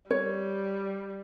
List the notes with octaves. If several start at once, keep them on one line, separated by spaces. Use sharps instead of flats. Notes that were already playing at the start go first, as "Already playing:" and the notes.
G3 C#5